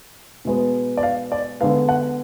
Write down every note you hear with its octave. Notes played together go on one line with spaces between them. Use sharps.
B2 G#3 B3
D5
F5
D5
D3 G#3 B3 F5
F#5